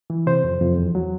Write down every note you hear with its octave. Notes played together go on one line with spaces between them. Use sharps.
E3
C3 C5
F2
F2
E2
F#3